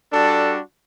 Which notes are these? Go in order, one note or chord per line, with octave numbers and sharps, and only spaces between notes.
G3 D4 F#4 A4